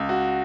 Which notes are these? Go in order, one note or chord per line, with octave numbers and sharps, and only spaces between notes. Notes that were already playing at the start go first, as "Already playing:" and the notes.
Already playing: C#2
F#4